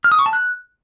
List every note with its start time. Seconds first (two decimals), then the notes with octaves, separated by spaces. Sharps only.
0.04 F6
0.12 D#6
0.19 C#6
0.26 A5
0.33 F#6